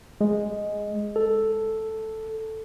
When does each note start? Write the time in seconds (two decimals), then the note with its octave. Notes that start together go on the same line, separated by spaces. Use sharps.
0.21 G#3
1.16 A4